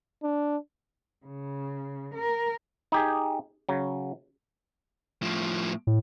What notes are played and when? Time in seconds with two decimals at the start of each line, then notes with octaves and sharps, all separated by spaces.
0.23 D4
1.26 C#3
2.15 A#4
2.92 D#4 G4 G#4
3.69 C#3 F#3
5.22 A2 F3
5.87 A2